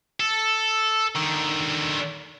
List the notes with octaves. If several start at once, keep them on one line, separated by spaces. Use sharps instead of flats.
A4
D3 D#3